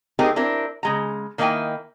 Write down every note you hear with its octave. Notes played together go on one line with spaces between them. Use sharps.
A3 C4 D#4 G4 G#4 A#4
C4 D4 E4 A#4
C#3 G#3 A#5
D#3 A#3 D#4 E4 G5 G#5